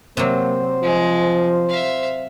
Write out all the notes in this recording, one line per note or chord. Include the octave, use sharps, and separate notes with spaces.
C3 F#3 A#3 C5
F3 G#3
E5 F5